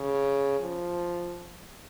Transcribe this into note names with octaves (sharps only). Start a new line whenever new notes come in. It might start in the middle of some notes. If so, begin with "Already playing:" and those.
Already playing: C#3
F3